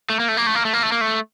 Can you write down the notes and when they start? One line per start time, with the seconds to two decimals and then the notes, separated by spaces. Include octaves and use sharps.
0.10 A3
0.20 A#3
0.28 A3
0.37 A#3
0.47 A3
0.55 A#3
0.65 A3
0.73 A#3
0.83 A3
0.92 A#3
1.01 A3